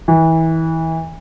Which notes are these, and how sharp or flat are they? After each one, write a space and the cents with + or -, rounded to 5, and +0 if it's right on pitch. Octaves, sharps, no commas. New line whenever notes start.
E3 -25